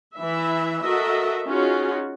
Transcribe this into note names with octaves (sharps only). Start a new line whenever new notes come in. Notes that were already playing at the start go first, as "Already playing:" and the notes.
E3 E5
F#4 A4 A#4 D#5 E5
C#4 D#4 F4 F#4 G#4